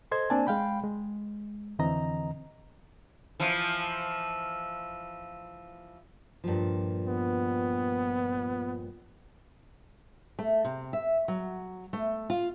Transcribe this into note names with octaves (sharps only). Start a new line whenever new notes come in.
A4 C5 D#5 C6 G#6
A#3 C4 D4 D5 G#5 A5
G#3 F5 G5 B5
G#3
F2 D3 E3 C4 D#5 A#5
E3 F3
G2 A#2 F3
B3
A3
C3
E5
F#3
A3
F4